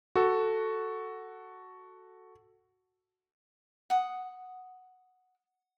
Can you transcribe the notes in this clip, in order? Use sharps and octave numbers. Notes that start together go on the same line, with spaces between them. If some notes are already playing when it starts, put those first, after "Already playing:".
F#4 A4
F#5 D#6